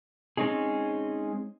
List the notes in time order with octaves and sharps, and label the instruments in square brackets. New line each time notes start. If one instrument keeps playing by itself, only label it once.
[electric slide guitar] G#3 C4 C#4 D#4 G#4